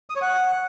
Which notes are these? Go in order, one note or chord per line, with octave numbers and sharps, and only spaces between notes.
D#6
C#5
F#5